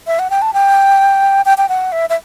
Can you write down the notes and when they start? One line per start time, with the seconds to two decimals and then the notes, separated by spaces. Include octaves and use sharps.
0.07 E5
0.19 F#5
0.30 G5
0.42 A5
0.53 G5
1.46 G5
1.58 G5
1.69 F#5
1.92 E5
2.09 E5